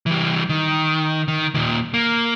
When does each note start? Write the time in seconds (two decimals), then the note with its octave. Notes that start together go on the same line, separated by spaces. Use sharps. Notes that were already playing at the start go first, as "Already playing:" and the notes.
0.06 E3 G3
0.49 D#3
1.28 D#3
1.54 D#2 A#2
1.94 A#3